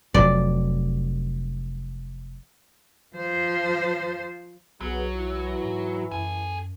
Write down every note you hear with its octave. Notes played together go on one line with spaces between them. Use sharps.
F1 F#3 D5
F3 C5
B1 F#3 B3 G#4
E3 E4
G#2
F#2 A4 G#5